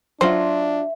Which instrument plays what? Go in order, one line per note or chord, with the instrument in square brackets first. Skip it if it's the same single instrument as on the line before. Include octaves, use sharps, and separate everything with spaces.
[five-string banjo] F#3 F4 [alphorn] D4 [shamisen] C5 [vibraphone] E5